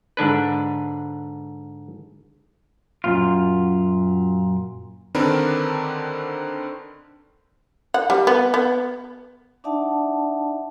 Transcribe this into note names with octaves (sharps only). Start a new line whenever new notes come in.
G#2 D3 D4 B4
F#2 A#2 F4
D3 D#3 C4 D4 A#4 B4
F#5
G3
B3
B3
D4 D#4 D5 E5 F#5 A5